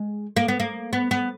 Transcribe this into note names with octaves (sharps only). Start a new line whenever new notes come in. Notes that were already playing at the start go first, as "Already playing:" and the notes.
Already playing: G#3
A#3
B3
A#3
B3
B3